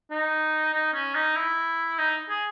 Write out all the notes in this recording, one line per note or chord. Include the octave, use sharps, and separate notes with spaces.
D#4
D#4
C#4
D#4
E4
D#4
G#4